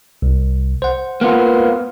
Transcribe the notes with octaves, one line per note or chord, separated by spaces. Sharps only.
C2
C5 F#5
A#3 B3 F4